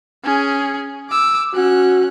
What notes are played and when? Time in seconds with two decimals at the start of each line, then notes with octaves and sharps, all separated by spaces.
0.24 C#4 G#4
1.10 D6 E6
1.54 C#4 F#4 F#6